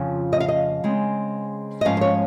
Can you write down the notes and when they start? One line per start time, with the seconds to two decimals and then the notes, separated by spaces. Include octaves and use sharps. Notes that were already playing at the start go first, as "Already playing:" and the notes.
Already playing: F2 C#3 F3
0.33 D#5
0.40 F5
0.48 D#5
0.84 C#3 G#3 C4
1.81 D#5
1.85 G#2 F3 G#3 C#4 F5
1.97 C5
2.01 C#5